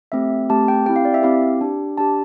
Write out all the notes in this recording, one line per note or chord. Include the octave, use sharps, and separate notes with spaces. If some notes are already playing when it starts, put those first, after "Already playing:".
A3 C4 G4 E5
A3 C4 G4 A5
G5
C4 E4 G4 G5
F5
D5
E5
C4 E4 G4 F5
D4 G4
D4 G4 A5